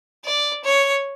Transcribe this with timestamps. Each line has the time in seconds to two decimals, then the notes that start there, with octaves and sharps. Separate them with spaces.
0.25 D5
0.64 C#5